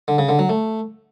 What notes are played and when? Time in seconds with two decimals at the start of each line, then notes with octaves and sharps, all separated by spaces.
0.08 D3
0.18 C#3
0.29 D3
0.39 F#3
0.49 A3